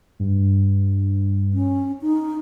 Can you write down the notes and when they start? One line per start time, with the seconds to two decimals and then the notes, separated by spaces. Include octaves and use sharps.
0.19 G2
1.53 C#4
2.02 D#4